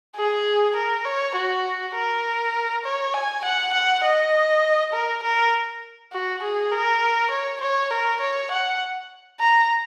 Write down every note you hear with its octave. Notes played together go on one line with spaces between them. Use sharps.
G#4
A#4
C#5
F#4
A#4
C#5
G#5
F#5
F#5
D#5
A#4
A#4
F#4
G#4
A#4
C#5
C#5
A#4
C#5
F#5
A#5